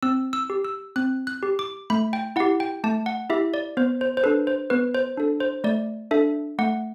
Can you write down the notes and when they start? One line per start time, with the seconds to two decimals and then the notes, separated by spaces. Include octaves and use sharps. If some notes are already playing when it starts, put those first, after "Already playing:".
0.03 C4 E6
0.33 E6
0.50 G4
0.65 E6
0.96 C4 F#6
1.27 F#6
1.43 G4
1.59 D6
1.90 A3 B5
2.13 G5
2.36 E4 G4 F#5
2.60 G5
2.84 A3 A5
3.06 F#5
3.30 E4 G4 E5
3.54 D5
3.77 B3 C5
4.01 C5
4.17 C5
4.24 D4 A4 B4
4.47 C5
4.70 B3 B4
4.95 C5
5.17 D4 A4
5.40 C5
5.64 A3 D5
6.11 D4 A4 E5
6.59 A3 F#5